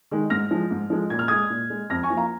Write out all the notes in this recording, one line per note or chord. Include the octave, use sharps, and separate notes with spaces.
D#3 G#3
G#2 F6 A#6
F3 G#3
G#2
F3 G#3
A#2 G#6
F6
G#3 D#6 G#6
A#2
G#3
F2 F6 A#6
G#5 C#6
F3 A#3
F5 A#5